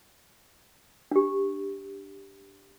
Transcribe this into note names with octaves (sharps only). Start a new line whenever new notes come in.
D4 G4